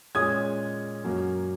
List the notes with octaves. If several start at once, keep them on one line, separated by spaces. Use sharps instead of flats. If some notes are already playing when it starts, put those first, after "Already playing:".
A#2 G#3 C#4 D#6 G#6
F#2 F#3 A#3 C#4